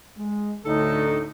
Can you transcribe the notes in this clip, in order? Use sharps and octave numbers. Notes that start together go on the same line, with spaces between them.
G#3
D2 A2 D3 D#4 A4